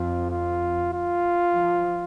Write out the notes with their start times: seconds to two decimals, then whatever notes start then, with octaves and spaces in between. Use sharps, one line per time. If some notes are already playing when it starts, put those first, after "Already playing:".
Already playing: F2 F4
0.30 F4
0.93 F4
1.55 F3